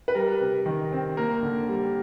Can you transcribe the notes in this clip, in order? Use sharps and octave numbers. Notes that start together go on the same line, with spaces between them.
B4
G3 A#4
C3
D#3
C4
A#3 A#4
D3
G3